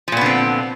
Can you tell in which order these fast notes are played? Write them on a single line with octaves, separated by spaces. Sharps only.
F3 A#2 B3 D3 C4